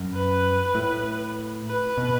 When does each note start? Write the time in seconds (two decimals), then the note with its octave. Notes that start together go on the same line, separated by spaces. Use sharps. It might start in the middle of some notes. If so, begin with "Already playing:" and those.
Already playing: F#2
0.14 B4
0.75 A2
1.67 B4
1.98 B2